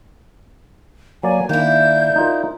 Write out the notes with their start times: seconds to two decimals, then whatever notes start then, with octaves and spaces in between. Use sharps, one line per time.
1.23 F#3 A#3 D5 G#5
1.49 D#3 A#3 D4 E4 G6
2.16 D#4 F4 A#4